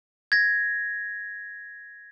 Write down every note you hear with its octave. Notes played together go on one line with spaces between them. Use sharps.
G#6 A#6